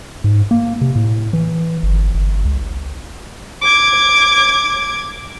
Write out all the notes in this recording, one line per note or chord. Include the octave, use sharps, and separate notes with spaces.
G#2
A#3
C3
A2
E3
G1
G1
C#2
D6 G#6